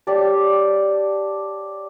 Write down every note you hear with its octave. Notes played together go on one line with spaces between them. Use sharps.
G4 C#5 D5 A5